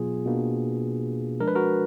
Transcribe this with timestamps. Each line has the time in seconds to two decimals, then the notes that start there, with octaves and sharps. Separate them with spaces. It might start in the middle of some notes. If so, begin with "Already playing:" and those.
Already playing: B2 F#3 B3 F4 G#4
0.26 B2 A#3 D4
1.40 F3 G#3 D4 A#4
1.48 B4
1.55 F#4 A#4